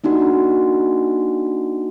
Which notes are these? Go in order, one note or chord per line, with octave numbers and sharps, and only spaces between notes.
A#3 D4 D#4 F#4